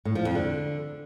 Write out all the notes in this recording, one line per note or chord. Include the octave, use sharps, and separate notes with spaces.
A2
F3
F2
D3